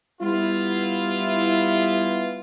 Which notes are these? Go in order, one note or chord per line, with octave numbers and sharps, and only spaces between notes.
G3 B3 E4 F4